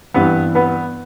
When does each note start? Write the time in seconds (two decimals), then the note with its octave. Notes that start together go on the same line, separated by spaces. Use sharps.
0.14 G2 E3 G3 B3 C4 B4
0.55 B3 B4